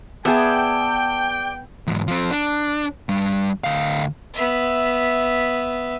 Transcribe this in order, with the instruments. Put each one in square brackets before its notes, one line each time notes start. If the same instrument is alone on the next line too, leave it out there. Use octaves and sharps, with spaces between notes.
[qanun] B3 G#4 [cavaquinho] D5 E5 [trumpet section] G5 [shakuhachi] A5
[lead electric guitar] E2 G#2
F3 C4
D4
G3 D4
D2 F5
[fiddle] B3 E5